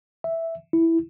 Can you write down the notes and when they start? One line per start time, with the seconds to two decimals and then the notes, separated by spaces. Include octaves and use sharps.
0.24 E5
0.73 E4